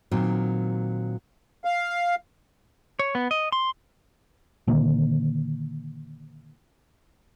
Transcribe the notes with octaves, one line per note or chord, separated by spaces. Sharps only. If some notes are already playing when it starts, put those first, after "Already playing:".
A#2 D#3 F#3 C4
F5
C#5
B3
D#5
C6
A#2 D3 D#3 A#3